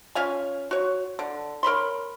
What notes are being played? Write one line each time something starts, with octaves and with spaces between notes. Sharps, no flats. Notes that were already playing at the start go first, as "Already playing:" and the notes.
C#4 F4 F5 G#5
F#4 C#5
D3
A#4 C#5 B5 C6